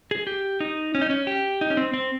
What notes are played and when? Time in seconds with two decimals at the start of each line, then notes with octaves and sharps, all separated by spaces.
0.11 G#4
0.27 G4
0.60 D#4
0.95 C#4
1.01 D#4
1.10 C#4
1.27 G4
1.61 D#4
1.70 C#4
1.77 C4
1.94 C4